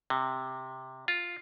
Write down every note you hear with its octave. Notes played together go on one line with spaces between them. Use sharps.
C3
F4